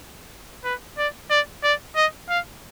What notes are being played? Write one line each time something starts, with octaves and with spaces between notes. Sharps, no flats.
B4
D5
D5
D5
D#5
F5